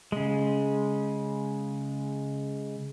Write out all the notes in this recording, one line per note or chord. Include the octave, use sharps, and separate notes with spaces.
C#3 G#3